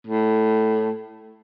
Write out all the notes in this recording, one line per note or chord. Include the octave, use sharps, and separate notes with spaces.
A2